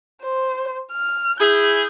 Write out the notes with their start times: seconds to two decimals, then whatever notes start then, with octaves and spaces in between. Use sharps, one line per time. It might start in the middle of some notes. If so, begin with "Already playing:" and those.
0.23 C5
0.92 F6
1.40 E4 G#4 G6